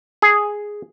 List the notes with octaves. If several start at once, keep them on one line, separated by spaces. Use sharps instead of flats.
G#4